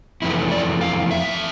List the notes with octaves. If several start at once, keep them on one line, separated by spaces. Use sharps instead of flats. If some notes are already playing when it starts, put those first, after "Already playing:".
F2 E3 A3 E4
D5
F5
E5